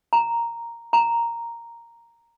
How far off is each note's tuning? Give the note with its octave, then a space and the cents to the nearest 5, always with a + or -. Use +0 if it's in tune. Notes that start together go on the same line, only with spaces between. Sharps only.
A#5 +0
A#5 +0